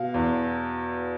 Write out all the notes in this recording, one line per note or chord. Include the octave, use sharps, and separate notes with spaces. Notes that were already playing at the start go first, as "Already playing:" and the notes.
Already playing: B2 F5
E2